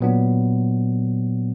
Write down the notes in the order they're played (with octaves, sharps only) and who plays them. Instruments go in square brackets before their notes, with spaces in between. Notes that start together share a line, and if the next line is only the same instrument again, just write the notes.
[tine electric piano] A#2 F#3 B3 D4